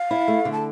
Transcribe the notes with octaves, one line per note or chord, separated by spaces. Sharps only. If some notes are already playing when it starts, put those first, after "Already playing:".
Already playing: F5
E4
A3
D3
A5